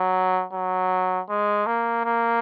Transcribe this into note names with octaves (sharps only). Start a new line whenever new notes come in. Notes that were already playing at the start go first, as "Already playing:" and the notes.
Already playing: F#3
F#3
G#3
A#3
A#3